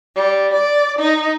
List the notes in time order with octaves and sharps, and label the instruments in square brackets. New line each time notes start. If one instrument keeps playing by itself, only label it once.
[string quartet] G3
D5
D#4